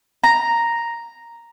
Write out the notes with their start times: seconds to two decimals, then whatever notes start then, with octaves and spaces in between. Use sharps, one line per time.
0.24 A#5